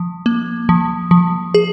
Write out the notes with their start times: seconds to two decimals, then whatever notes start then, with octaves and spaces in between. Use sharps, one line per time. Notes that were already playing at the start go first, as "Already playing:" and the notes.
Already playing: F3
0.26 A#3
0.69 F3
1.11 F3
1.54 G#4